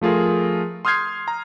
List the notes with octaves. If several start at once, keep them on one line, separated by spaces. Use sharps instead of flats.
F3 A3 F4 G#4 A#4
C6 D#6 F6 G6 G#6 C7
A#5